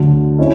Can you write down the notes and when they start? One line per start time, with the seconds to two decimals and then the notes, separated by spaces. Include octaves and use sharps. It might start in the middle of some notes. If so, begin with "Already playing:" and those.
Already playing: D2 D3 F#3
0.39 C#4 E4